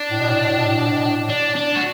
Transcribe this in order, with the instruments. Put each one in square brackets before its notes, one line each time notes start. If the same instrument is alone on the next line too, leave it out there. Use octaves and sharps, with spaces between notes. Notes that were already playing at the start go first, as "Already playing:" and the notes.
Already playing: [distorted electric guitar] D4
[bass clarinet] A2
B2
A2
B2
A2
B2
A2
B2
A2
B2
A2
[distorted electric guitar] D4
D4
F#4